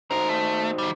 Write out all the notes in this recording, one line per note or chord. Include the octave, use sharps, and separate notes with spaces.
D#4 F#4 A4 C5 A#5
A3
D#3 G3